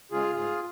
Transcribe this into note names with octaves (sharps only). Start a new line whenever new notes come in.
C#3 G#3 F4 G#4
G#2 F4 G#4